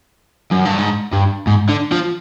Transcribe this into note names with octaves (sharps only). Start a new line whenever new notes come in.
F#2
G2
G#2
G2
G#2
D3
F3